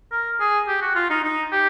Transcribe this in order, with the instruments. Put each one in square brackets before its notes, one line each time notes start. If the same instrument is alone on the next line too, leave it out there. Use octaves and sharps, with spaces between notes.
[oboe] A#4
G#4
G4
F#4
F4
D#4
D#4
G4